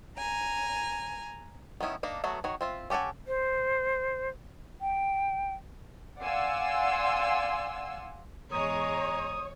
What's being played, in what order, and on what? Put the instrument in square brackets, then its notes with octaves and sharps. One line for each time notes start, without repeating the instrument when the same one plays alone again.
[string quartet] G#5 A#5
[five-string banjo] D#3 B3 C#4 E4
A#3 D4 D#4
F#3 A3 B3 F#4
D#3 F#4 C#5
C4 F4 E5
C#4 G4 A4 F#5 G#5
[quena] C5
G5
[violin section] D5 F5 F#5 G#5 C6 E6
[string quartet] E2 G#2 G#3 [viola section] C#5 [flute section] A#5 [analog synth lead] D#6